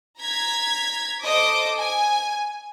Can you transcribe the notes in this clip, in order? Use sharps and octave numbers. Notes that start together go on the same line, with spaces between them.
A#5 G#6 B6
A4 C5 D#5 D6 D#6
G#5